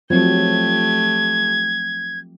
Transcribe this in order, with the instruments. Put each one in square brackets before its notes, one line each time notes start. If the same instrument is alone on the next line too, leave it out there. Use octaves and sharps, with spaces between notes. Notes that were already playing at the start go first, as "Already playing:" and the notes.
[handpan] F3 F#3 C4 [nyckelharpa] A3 G4 [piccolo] G#6